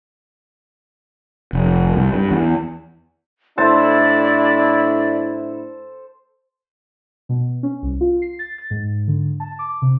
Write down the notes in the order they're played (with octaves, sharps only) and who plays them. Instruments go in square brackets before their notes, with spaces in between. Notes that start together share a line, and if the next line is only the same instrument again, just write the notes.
[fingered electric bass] F1
C2
G2
E2
[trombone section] A2 D4 E4 [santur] A4 C5 A5 [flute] D5
[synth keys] B2
C#4
C2
F4
C7
A6
A6
G#2
D3
A5
D6
C3